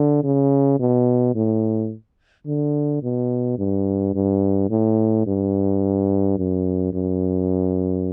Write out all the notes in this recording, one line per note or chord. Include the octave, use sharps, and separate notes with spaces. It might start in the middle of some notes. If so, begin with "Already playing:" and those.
Already playing: D3
C#3
B2
A2
D3
B2
G2
G2
A2
G2
F#2
F#2